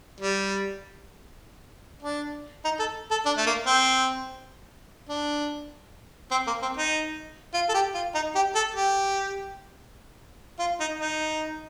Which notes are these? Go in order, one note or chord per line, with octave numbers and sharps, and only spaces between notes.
G3
D4
D#4
A4
A4
D4
A3
A#3
C4
D4
C4
A#3
C4
D#4
F4
A4
G4
F4
D#4
G4
A4
G4
F4
D#4
D#4